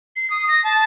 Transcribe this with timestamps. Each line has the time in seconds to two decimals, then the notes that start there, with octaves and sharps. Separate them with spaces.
0.16 C7
0.30 D#6
0.48 A#6
0.64 A5